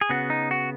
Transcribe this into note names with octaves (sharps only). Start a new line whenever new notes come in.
G#4
C#3 B3 F#4
D#4
F#4